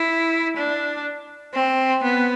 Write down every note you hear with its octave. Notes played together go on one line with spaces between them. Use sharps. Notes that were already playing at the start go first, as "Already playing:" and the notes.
Already playing: E4
D4
C4
B3